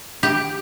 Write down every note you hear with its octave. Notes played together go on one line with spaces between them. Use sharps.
G4